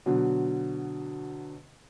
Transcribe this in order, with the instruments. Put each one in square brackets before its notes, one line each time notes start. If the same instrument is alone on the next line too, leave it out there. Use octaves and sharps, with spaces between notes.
[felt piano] B2 D3 F#3